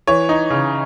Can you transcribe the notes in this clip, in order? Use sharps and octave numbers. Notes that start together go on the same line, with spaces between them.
E3 C#5
D#4
C#3